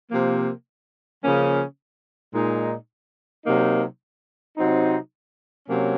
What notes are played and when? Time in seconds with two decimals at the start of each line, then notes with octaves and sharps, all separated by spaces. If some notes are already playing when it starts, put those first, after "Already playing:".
0.11 C3 F3 A#3
1.23 C#3 F3 A#3 C#4
2.34 A#2 G#3 D#4
3.45 C3 F#3 A#3 D#4
4.57 C3 F#3 C4 D#4
5.68 C3 F#3 A#3 C#4